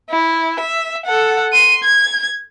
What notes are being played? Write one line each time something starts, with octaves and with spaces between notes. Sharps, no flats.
E4
E5
A4 F#5
C6 D#7
G#6